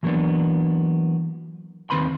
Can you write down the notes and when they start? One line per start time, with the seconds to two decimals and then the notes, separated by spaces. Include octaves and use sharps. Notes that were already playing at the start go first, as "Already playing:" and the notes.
0.03 E3 F#3 A#3 B3 D4
1.90 D#2 D#3 C4 B4 B5 C6